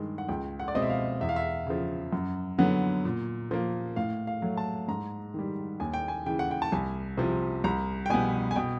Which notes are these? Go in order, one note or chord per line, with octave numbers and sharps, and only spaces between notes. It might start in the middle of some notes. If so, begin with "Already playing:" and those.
Already playing: G2 D#3 G#3
F#5
C#2 G5
F#5
D5
B2 G#3 C4 D#5
E5
F5
E2 E5
F5
E5
C#3 F3
F#2
D3 F#3 B3
A#2
F3 A#3
A2 F5
F5
F#3 A3
A5
G#2 A#5
D#3 G3
D#2 G#5
G5
G#5
C#3 E3 G5
F#5
G5
A5
C2 G#5
C3 F3
C2 A#5
G5
B2 G3 B3 G#5
G#5
B2 G5